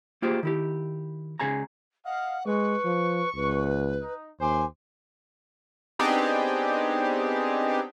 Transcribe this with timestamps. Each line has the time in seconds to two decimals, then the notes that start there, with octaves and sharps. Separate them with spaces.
0.22 A#3 F4 G4 G#4 C5
0.43 D#3 E4 G4
1.40 C#2 C#3 G#4 G#5 A#5
2.05 D#5 F5 F#5
2.46 G#3 B4 C#6
2.84 F3
3.36 C#2 B4
4.01 D#4
4.40 D#2 C5 G#5 C6 D6
5.99 B3 C4 D4 D#4 G4 G#4